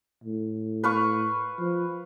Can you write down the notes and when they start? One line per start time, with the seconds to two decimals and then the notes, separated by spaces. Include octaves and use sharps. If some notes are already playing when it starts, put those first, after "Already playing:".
0.24 A2
0.84 B4 F5 C#6
1.59 F3